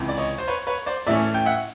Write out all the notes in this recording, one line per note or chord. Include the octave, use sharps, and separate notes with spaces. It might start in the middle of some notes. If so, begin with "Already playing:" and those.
Already playing: C#2 C3 E3
D5
C#5 D#5
C5
B4 C#5
B4 C#5
C5 D5
A2 E3 A3 C#4 D5 E5
G5
E5 F#5